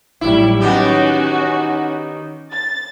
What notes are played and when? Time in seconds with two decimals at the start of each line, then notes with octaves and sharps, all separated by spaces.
0.21 A1 F#3 G3 E4
0.60 D#3 B3 C#4 F#4 G4
2.51 A6